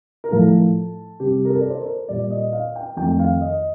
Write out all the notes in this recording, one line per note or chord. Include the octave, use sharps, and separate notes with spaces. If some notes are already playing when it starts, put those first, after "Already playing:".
A#4
A2 F3 A3 A4
C3 G3 G4
A#4
A4
D5
C5
A#4
A#2 G3 D5
D#5
F5
G5
F2 D#3 A3 G5
F5
D#5